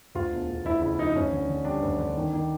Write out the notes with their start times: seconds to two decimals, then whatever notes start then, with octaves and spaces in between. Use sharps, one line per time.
0.15 D2 F4
0.32 E1
0.49 E1
0.65 D2 E4
0.81 C#3 E4
0.98 F3 D#4
1.16 D2 C#4
1.32 D3
1.49 D3
1.65 G3 D4
1.82 D2
1.99 D3
2.16 D#3
2.33 D#3